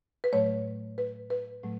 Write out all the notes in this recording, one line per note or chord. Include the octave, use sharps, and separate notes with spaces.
B4
A2 F#3 A3 C#5
B4
B4
A2 F#3 A3